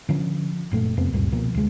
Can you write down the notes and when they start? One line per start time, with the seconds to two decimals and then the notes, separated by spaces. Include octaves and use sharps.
0.09 D3 F3 C#4
0.71 F#1 A#2 A3
0.97 F2 C3 B3 C4
1.13 C#2 F#2 A#2 G3
1.32 B2 F3 A#3
1.54 D2 G#3